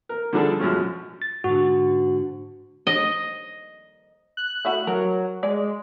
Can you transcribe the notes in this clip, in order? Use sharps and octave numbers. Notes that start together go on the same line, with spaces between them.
A#4
D3 F3 G3 D4 G#4 A4
F#2 B2 F3 G#3 C#4 F4
A6
G#2 D3 F#4
D#5
F#6
A3 E4 F#4
F#3 A#4
G#3 D5